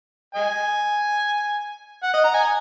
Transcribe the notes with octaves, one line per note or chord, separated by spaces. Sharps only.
D#5 G#5
F#5
D#5
A#5
G#5